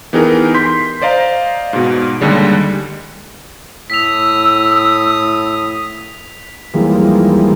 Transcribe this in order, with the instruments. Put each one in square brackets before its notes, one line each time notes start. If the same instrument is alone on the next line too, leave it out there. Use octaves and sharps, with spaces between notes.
[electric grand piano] E3 B3 D#4 G4 G#4 A#4
C6 G6 B6
C5 D5 D#5 F5 A#5
G#2 B2
D#2 D3 G3 G#3
[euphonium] A2 [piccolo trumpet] D#6 [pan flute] E6 [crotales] B6 F7
[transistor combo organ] D#2 E3 F3 G3 G#3 A#3